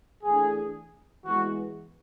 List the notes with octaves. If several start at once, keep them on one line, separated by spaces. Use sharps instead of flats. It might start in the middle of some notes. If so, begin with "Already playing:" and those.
E3 A3 D4 G#4
E3 G#3 B3 F#4